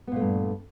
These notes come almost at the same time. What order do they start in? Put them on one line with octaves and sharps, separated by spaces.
B3 A#2 A3 G2